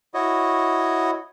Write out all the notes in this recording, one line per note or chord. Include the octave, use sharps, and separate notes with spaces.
E4 F#4 C#5 D#5